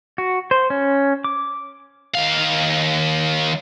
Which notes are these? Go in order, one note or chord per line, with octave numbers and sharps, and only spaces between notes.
F#4
C5
C#4
D6
D#2 F5